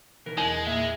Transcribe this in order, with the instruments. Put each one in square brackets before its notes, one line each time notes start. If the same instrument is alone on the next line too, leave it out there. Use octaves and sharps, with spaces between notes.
[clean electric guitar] B1 E3 A#4
[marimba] E2 [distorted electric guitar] G#3
[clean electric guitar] A#2 A#3 E5